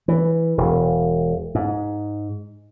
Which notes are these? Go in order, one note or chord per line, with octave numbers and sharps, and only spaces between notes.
E3
E1
G#2